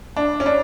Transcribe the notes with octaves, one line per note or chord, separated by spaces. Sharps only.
D4
C#4
D4